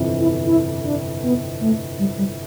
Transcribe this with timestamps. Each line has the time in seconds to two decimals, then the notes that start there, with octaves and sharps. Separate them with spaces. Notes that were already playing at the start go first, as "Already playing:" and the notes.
Already playing: G1 F2 C3 E3
0.20 E4
0.45 E4
0.83 D4
1.22 B3
1.60 A3
1.99 G3
2.18 G3